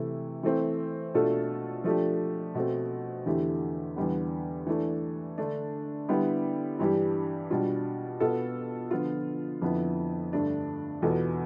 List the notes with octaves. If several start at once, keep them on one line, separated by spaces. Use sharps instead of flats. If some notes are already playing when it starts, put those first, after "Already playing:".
Already playing: C3 E3 A3 E4
E3 A3 C4
B2 A3 D4 F4 A4
F3 A3 D4 G4
B2 A3 C4
E2 D3 A3 E4 G4
E2 D3 G3 B3
E3 A3 D4
D3 A3 D4
D3 G3 B3 E4 G4
G2 E3 G3 D4 G4
B2 G3 D4 F4
B2 B3 F4 A4
D3 F3 B3 F4
F2 D3 F3 B3 E4
G2 D3 A3 D4
E2 B2 B3 F4 A4